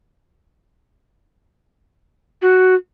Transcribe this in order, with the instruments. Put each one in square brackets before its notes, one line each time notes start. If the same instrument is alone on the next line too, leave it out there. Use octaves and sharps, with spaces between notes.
[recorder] F#4